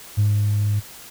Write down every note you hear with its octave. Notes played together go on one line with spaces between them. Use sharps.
G#2